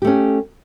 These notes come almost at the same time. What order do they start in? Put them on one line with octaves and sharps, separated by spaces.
G4 A3 C#4